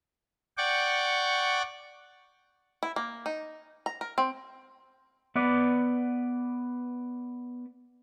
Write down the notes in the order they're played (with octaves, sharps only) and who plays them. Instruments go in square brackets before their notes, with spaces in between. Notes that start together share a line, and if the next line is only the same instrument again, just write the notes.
[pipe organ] D5 F#5 G5 C#6 D6
[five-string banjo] E4
A#3
D#4
A#5
A#4
C4
[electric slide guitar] B3 B4 D5